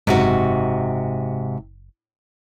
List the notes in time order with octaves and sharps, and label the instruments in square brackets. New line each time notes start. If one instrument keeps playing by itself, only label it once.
[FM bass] F#1 [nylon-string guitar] G#2 C3 F#4